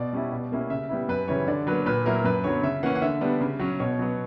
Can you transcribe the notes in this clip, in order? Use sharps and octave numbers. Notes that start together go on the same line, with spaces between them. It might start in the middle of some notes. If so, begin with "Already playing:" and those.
Already playing: B2 D5
G3 C#4 E4
B2
G3 A#3 C#4 E4
C#3 E5
G3 B3 E4
F#2 B4
C#3 E3 G3 C#5
D3 D5
F#3 A#3 B4
A#2 B4
F#3 A#3 E4 A#4
F#2 B4
D3 F#3 B3 C#5
C#3 E5
E3 A#3 C#4 F#5
F#5
D3 E5
G3 B3 D4
C#3
F#3 C#4
B2 C#5
F#3 B3